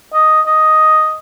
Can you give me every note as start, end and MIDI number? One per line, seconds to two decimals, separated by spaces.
0.14 0.41 75
0.47 1.18 75